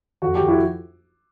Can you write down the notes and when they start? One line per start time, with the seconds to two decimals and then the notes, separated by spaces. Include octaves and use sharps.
0.22 F2 F#4
0.35 F2 G4
0.48 E4 F#4